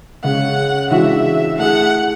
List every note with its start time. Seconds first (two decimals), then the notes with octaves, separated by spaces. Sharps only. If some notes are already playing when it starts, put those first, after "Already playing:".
0.24 C#3 G#3 C#4 F#5
0.91 C#3 E3 G#3 D4 F#4 E5
1.58 A3 E4 G#4 F#5